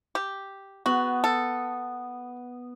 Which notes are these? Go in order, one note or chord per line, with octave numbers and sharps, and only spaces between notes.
G4
B3 F#4
A4